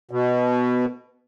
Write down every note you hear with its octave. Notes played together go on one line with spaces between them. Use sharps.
B2